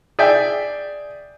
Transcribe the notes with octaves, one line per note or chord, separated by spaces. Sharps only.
G#4 D5 E5 G5